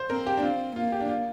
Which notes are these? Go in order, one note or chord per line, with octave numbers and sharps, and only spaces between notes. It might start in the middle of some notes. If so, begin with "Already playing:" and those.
Already playing: C5
C4 A#4
G4
D4
C4 F4
A#3 F4
G4
D4
F4